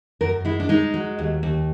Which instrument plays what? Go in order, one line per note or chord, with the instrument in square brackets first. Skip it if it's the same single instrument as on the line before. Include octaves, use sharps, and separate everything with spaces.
[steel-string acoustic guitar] F#2 A#4
G#3 E4
D4
G#3 D#4
F#3
D#2
D#2